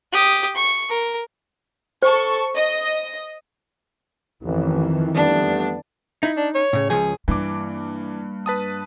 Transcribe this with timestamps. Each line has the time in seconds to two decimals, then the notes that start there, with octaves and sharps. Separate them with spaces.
0.12 G4 D#6
0.55 C#6
0.89 A#4
2.02 A4 C5 C#6
2.56 D#5
4.43 A1 F2 D#3 E3
5.15 G3 A3 B3 D4
6.23 D#4 E4
6.37 D4
6.55 C#5
6.73 A2 C#3
6.90 C#2 F3 G#4 C#5
7.28 G2 E3 A#3 D6
8.46 B4 A5 D#6